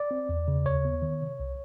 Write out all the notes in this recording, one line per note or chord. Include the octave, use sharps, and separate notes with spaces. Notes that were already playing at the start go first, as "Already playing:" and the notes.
Already playing: D5
C4
E2
C#3
D#2 C#5
B3
D#3
C3
C2